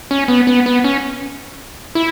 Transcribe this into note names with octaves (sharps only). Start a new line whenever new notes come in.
C#4
B3
B3
B3
C#4
E4